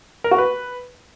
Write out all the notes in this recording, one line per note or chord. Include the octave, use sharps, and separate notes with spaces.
A#4
F#4
B4